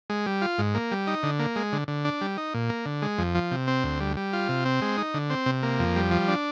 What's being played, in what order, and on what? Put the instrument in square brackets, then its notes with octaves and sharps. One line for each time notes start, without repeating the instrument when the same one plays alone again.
[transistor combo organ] G#3
G3
F4
G#2
A#3
G3
D#4
D3
A#3
G#3
D3
D3
D4
G3
D#4
A#2
A#3
D3
G#3
F2
F3
C3
C4
D2
G3
G3
F4
C3
C4
G#3
D#4
D3
C4
C3
A#3
F2
G3
F3
D4